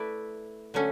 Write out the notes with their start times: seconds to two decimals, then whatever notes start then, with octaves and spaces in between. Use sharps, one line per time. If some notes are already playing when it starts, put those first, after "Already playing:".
Already playing: A3 E4 B4 D5
0.74 D3 F#3 A3 C#4